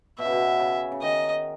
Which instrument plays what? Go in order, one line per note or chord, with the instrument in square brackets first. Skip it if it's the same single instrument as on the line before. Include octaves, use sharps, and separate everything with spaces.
[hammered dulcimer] B2 [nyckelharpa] E5
[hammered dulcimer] C#3
B2
C#3
C#3
[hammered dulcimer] D#3 [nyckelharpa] D#5